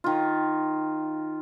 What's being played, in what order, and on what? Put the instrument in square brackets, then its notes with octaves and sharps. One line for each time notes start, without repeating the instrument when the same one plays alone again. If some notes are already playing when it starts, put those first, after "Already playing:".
[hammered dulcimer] D#3 F4